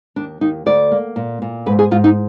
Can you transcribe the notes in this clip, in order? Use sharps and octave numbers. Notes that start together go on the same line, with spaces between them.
D#2 D4
D#2 D#4
D2 D5
A#3
A#2
A#2
G#2 B4
G#4
G#2 F4
D#4